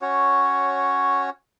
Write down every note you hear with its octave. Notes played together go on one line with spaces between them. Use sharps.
C#4 F#4 C#5